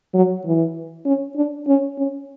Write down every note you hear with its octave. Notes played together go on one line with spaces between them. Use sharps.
F#3
E3
C#4
D4
C#4
C#4